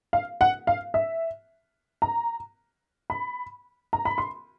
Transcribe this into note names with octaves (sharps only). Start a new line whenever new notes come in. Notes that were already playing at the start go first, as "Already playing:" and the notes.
F5
F#5
F5
E5
A#5
B5
A#5
B5
C6